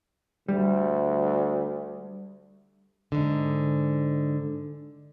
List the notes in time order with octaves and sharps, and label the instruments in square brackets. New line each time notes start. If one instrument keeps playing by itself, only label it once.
[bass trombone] D2 [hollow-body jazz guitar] G3
[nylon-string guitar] G#2 D3